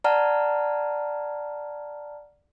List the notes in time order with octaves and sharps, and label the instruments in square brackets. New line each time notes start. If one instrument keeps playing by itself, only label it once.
[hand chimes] D5 F#5 A5 A#5 F6